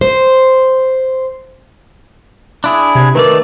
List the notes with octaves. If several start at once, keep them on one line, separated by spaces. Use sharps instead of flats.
C5
D4 E4 G#4
C3 G#6
D#3 A3 A#4 B4 D5